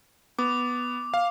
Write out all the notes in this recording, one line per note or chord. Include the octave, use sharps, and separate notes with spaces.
B3 D6
F5